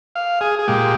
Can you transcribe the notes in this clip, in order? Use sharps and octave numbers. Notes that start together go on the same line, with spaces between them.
F5
G#4
G#4
A#2 G#3 G4